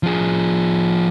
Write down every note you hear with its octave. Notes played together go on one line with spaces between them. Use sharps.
F3 G#4